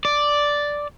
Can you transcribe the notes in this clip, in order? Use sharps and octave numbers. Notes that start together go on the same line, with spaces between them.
D5